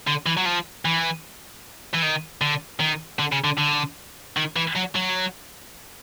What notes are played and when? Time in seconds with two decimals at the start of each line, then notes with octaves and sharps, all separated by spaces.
0.07 D3
0.26 E3
0.37 F#3
0.46 F3
0.85 E3
1.94 E3
2.02 D#3
2.41 D3
2.80 D#3
3.19 D3
3.32 C#3
3.44 D3
3.58 D3
4.37 D#3
4.56 E3
4.76 F#3
4.95 F#3